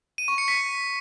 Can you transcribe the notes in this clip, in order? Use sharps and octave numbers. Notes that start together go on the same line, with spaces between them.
D#7
C#6
C#7
B6